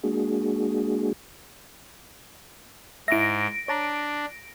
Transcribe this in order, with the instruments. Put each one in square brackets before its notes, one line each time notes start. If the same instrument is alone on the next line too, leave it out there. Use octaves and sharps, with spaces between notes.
[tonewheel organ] G#3 A#3 D4 F#4 G#4
[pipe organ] G#2 [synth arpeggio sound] E4 E5 [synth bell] A#6 D7
[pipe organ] D4 [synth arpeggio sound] C#5 A5 A#5